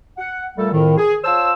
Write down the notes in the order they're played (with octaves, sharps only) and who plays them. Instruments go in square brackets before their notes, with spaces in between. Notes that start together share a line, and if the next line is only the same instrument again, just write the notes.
[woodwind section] F#5
A#2 G3 A3 A4
F2 A2 D#3
G#4
F4 C5 C#5 A5 E6